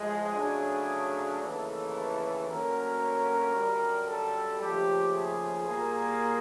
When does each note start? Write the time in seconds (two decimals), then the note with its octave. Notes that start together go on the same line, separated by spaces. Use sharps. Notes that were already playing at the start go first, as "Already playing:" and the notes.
Already playing: A2 F3 G#3 G#4
0.34 C#3 F#3 A3 D4
1.40 D#2 C#3 E3 A3 A4
2.47 D2 D3 F#3 A#3 C#4 A#4
3.54 F#2 D3 G3
4.07 A4
4.60 D#2 C#3 F3 A3 G4
5.13 G#4
5.66 A#2 G3 A#3